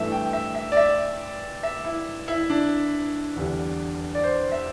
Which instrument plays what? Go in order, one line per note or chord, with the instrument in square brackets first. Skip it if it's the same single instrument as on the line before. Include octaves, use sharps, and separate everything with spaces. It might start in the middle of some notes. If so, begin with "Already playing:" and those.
Already playing: [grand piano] G2 E3 A3 E5
G5
E5
E5
D5
E5
E5
E4
E4
D4
E2 D3 G3
D5
C5
E5